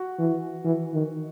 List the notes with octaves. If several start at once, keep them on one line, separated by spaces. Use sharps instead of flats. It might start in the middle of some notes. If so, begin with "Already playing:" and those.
Already playing: F#4
E3
E3
D#3